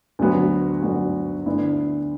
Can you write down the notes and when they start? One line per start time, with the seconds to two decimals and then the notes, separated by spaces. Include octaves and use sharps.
0.19 D2 D3 F#3 B3 F#4
0.82 D2 D3 F#3 B3 F#4
1.46 D2 D3 B3 E4